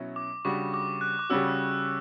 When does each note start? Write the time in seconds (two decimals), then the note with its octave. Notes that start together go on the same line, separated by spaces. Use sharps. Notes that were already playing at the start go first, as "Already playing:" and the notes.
Already playing: B2 F#3 C#4 E4
0.16 D6
0.45 C#3 G3 D4 F#4 C#6
0.74 D6
1.01 F#6
1.19 D6
1.30 C#3 G3 C#4 F#4 E6